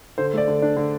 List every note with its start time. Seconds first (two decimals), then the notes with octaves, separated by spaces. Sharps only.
0.18 D3 C5
0.34 A3 D5
0.48 D3
0.62 D4
0.77 D3